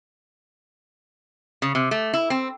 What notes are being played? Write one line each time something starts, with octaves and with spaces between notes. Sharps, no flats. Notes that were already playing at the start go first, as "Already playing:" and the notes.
C#3
C3
A3
E4
C4